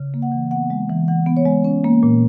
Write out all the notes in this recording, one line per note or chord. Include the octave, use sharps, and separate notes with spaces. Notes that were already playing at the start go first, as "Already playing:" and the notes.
Already playing: C#3
A#3
F#5
E3
B3 F#5
G#3
E3
E3 F#5
B3
C#5
G#3
C#4
A#3
A#2